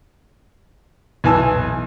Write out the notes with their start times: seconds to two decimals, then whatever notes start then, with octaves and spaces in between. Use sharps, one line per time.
1.24 B1 E3 G#5 A5 E6